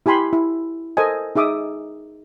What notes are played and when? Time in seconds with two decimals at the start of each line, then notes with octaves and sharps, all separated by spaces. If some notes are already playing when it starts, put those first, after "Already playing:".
0.06 E4 G4 G#5 B5 C6
0.33 E4
0.97 A4 A#4 C5 D#5 G#5
1.36 D#4 G#4 E5 D6 D#6